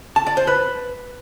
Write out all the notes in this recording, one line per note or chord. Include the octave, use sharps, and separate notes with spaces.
A5
D5
C5
B4